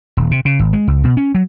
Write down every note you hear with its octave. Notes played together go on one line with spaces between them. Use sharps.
D#1
C3
C#3
G#1
G#3
C#2
B2
C#4
F#3